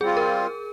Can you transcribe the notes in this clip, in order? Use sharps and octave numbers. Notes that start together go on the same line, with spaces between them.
G3 C4 F4 G#4
A#4